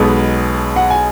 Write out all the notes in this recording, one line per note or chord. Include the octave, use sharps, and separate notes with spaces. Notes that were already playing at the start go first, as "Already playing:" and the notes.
Already playing: B1 B2 G#3 B3
F#5
G#5